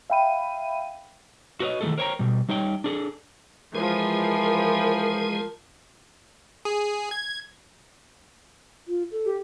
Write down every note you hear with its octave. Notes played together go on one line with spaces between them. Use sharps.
E5 F5 G5 B5 D#7
F#4 B4 C#5 D#5
D#3 E3 G#3 A3 G#4 A4
A#4 C5 C#5 F#5 G5 A#5
B2 G3
G3 D#4 C#5 G5
D4 G#4 A4
E3 F3 G#3 G#4 A#4
G#4
G#6
F4
A4
G4